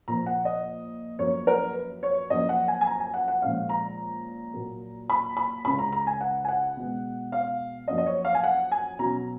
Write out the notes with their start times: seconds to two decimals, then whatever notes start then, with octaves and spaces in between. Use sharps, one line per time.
0.08 A#2 F3 A#3 A#5
0.26 F#5
0.45 D#5
1.19 F#2 F3 A#3 C#4 C#5
1.47 A#4
1.75 B4
2.03 C#5
2.30 F#2 F3 A#3 C#4 D#5
2.49 F#5
2.68 G#5
2.81 G#5
2.86 A#5
3.00 G#5
3.14 F#5
3.28 F#5
3.42 A#2 F3 G#3 C#4 F5
3.69 A#5
4.54 A#2 F#3 A#3
5.10 B5
5.37 B5
5.65 C#2 C#3 G#3 B5
5.79 A#5
5.92 A#5
6.07 G#5
6.21 F#5
6.44 G#5
6.48 F#5
6.77 B2 G#3 B3
7.32 F5
7.88 F#2 F3 A#3 C#4 D#5
7.98 D#5
8.06 C#5
8.25 F5
8.34 G#5
8.43 F#5
8.72 G#5
8.99 B2 F#3 C#4 A#5